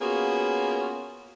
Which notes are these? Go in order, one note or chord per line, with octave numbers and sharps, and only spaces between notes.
A#3 B3 C#4 F4 F#4 G#4